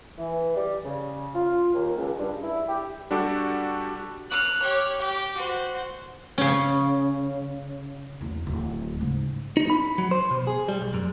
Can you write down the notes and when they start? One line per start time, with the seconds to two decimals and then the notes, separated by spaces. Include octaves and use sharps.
0.19 E3
0.56 G3
0.85 C#3
1.35 F4
1.74 D#2
1.97 C#2
2.19 G2
2.43 E4
2.69 G4
3.11 G3 D4 F#4 G4 A4
4.30 F6 F#6
4.63 G4 C#5
4.99 G4
5.37 F#4 C5
6.38 C#3 C#4
8.21 B1 E2
8.47 D1 F#3
9.00 G#2 C#3
9.57 D#4
9.70 B5
9.98 F#3
10.11 C5
10.31 B2
10.47 G#4
10.68 G3
10.81 B1
10.94 F#2